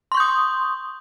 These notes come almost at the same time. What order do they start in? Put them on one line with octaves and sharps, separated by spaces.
C6 C#6 G6 D#6